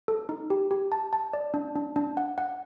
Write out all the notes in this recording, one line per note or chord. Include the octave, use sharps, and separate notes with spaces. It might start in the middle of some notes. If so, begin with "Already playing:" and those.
A4
D#4
G4
G4
A5
A5
D5
D4
D4
D4
F#5
F#5